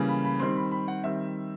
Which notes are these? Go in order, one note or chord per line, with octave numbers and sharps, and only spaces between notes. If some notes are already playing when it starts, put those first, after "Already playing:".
Already playing: C#3 E3 G3 A#3
B5
B5
D#3 G3 C4 C6
B5
B5
F#5
D#3 G3 C4 E5